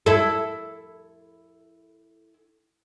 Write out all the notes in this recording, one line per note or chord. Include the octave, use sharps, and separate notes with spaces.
E4 A4